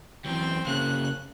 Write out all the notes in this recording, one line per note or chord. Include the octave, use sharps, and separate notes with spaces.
F#2 E3 C4 G5
C#3 A#3 F#6